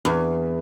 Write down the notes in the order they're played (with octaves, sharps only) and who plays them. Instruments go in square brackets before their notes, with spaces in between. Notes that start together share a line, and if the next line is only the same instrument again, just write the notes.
[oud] E2